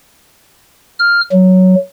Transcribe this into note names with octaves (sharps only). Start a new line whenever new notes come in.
F6
F#3